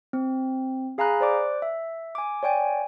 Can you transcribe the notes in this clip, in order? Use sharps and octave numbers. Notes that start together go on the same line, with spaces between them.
C4
G#4 F5 G#5 A#5 B5 F#6
C5 D5 D6 F#6
E5
G#5 D6
C#5 D5 G5 G#5